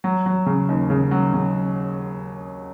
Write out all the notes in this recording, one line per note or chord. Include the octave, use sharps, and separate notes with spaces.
F#3
F#3
C#3
D#2
C#3
F#3
C#3